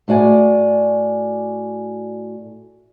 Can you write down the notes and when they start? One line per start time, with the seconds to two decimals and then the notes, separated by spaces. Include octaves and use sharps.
0.08 A2 F#4 D5 G#5